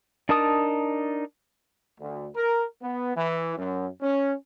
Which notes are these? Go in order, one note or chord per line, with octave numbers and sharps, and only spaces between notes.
D4 D#4 A#4 A5 D#6
D2
A#4
B3
E3
F#2
C#4